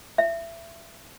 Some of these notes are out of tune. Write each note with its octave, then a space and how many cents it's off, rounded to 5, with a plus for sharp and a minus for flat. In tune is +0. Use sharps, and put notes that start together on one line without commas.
E5 +25